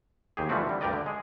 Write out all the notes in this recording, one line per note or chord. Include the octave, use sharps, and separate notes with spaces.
D#2 G4 G#4
E3 F3 G3 A3 C4 F#4
D3 G3
D2 G2 G4 A#4 D5 D#5
D3
G#3 G#4